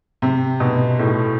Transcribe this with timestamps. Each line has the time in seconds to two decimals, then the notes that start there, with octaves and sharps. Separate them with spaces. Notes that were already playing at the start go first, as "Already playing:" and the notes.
0.22 C3
0.60 B2
0.99 A2